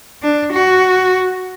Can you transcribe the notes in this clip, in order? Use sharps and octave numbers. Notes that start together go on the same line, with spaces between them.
D4
F#4